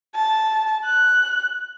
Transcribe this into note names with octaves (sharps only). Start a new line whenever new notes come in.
A5
F#6